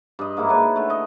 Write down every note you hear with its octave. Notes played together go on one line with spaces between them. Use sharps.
G2 D#5
G#2 A#3 E4 A#4
F#4 A4 B4 C#5
D3 A3
D#5